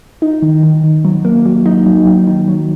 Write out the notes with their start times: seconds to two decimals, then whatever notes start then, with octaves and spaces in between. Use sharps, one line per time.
0.22 D#4
0.42 D#3
0.63 D#3
0.84 D#3
1.05 F#3
1.25 A#3
1.46 F#3
1.66 D#4
1.86 F#3
2.06 D#3
2.27 D#3
2.48 F#3